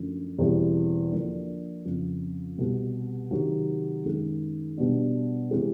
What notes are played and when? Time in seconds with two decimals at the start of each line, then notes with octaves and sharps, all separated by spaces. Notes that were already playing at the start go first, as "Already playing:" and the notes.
Already playing: F#2 D3 F3 A3
0.39 E2 B2 G3 C4 E4
1.12 D3 F3 A#3 D4
1.85 F2 C#3 F3
2.58 C2 B2 G3
3.31 C3 D#3 F#3
4.05 F#2 D#3 G#3
4.78 B2 G3 B3 D4 F#4
5.51 C3 E3 G#3 C4